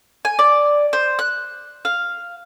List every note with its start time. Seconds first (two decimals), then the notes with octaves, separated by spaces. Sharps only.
0.25 G#5
0.39 D5
0.93 C5
1.19 F#6
1.85 F5